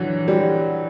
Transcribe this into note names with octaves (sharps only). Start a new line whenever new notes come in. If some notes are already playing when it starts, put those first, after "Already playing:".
Already playing: D3 E3 F#3
G3